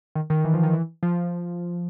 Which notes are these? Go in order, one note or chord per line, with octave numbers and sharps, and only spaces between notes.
D#3
D#3
E3
F3
D#3
E3
F3